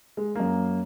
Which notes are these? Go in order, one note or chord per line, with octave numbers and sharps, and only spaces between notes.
G#3
F#2 A#3